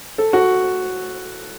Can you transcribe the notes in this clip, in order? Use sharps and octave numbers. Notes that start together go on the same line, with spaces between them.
A4
F#4